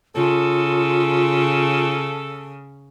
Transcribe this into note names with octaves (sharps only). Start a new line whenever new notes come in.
C#3 F4 A4